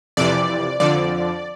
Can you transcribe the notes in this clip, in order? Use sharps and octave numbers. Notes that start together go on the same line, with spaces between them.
F2 C3 E3 D5
F2 D3 F3 D5